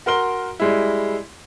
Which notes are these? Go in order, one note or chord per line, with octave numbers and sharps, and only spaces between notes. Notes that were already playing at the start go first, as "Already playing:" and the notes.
F#4 A#4 C6 G7
G3 G#3 E4